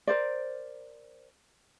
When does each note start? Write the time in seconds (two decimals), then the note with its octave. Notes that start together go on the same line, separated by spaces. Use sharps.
0.07 A#4 C5 D5